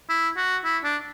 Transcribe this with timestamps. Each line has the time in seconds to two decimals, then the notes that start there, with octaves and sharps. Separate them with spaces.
0.09 E4
0.37 F#4
0.65 E4
0.84 D4